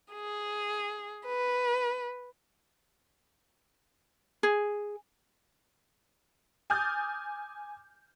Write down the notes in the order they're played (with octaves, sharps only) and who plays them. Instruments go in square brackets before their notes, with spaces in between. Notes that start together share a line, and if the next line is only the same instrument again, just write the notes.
[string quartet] G#4
B4
[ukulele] G#4
[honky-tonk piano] G#5 D6 D#6 F6 G6 A6